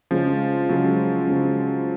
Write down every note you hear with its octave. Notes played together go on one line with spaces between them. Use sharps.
C#3 F3 G#3 C#4
C#3 F#3 G#3 C#4
C#3 G#3 C#4